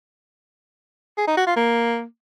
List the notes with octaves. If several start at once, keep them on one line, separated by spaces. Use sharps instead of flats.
G#4
D#4
F#4
F4
A#3